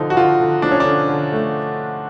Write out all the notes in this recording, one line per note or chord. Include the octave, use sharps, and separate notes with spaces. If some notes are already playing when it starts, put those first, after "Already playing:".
Already playing: D3 F3 D#4
F#4
D3 F4
D3
F3 D4
C#4
D4
D3
D3
A3